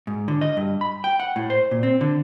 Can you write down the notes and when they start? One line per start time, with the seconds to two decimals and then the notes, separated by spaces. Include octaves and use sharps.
0.07 G#2
0.28 D3
0.41 D#5
0.57 G2
0.81 B5
1.04 G5
1.20 F#5
1.36 A2
1.50 C5
1.71 A#2
1.83 C4
2.01 D3